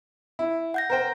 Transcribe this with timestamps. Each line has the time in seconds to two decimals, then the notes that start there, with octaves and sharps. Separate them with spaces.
0.39 E4
0.74 F#5 G6 A#6
0.90 A#4 C5 G5